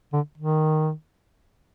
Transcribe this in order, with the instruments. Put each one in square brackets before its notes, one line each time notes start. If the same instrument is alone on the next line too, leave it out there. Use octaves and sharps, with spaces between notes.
[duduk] D3
D#3